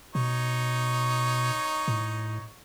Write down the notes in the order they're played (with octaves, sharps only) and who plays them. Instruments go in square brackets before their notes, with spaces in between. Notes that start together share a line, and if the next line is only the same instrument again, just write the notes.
[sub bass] B2 [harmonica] D#4 C#5
[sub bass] A2